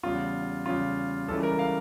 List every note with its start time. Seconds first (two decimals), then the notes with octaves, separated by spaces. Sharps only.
0.03 E2 C#3 G3 F4
0.66 E2 C#3 G3 F4
1.28 C#2 C#3 E3 G3 A4
1.43 A#4
1.59 F5